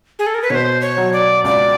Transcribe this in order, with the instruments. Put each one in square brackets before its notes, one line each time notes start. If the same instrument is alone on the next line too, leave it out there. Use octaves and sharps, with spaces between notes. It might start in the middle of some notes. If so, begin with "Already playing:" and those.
[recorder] G#4
A4
A#4
B4
[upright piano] B2 [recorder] C#5
[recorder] C5
C#5
[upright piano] F#3
[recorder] D5
[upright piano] C#2 [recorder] D5